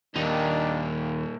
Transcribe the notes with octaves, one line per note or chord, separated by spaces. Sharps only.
D#2 A#2 D#3 D4 D#4